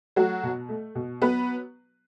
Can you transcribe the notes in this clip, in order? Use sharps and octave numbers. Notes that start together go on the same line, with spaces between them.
F#3 A3 F#4
B2
A3
B2
F#3 B3 B4